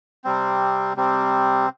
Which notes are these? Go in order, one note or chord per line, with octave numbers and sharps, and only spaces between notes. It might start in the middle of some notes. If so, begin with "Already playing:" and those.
C3 G3 C4
C3 G3 C4